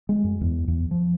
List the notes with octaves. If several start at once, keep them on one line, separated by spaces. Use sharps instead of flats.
G#3
F#2
E2
E2
F3